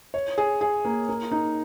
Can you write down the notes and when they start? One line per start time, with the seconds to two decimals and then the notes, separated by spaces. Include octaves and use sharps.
0.14 C#5
0.38 G#4
0.61 G#4
0.85 A#3
1.09 A#3
1.31 D#4